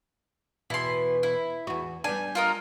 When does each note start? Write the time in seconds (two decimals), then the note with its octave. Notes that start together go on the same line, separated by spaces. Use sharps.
0.70 E2 B2 E3 E4 C6
1.23 E4
1.67 E2 F#4
2.04 G3 B3 D4 G#5
2.35 F4 A#4 D#5